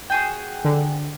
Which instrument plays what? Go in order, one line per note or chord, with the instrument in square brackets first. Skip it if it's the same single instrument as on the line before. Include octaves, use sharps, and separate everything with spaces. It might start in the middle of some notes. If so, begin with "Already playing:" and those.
[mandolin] F#4 G#4 G5
[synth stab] D3